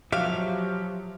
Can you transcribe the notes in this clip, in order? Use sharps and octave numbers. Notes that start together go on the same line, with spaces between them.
F3 F#3 F#4 G4 E5 F5